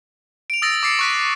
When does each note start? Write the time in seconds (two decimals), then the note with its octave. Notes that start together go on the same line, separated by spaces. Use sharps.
0.50 D7 F7
0.62 D#6 E6 A6 A#6 D7
0.83 D6 A6 C7 C#7
0.99 C#6 F#6 B6